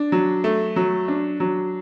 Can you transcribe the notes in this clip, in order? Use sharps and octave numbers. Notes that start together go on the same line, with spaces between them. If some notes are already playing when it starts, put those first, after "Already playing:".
Already playing: D4
F#3
A3
F#3
D4
F#3